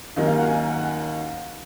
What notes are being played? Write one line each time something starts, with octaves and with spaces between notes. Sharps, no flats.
D#2 D#3 F#3 A#3 C#4 D#5
F5
F#5
G#5
G#5
F#5
F#5